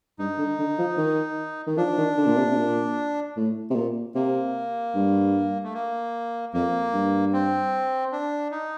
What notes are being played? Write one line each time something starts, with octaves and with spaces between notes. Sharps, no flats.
G2 D#4
D3
D3
F3
D#3
D#3
F3 D4
D#3
D3
A#2
C3
C3
A#2
A2
C3
A#2
C3 A#3
G2
A3
A#3
F2 A#3
G2
C4
D4
D#4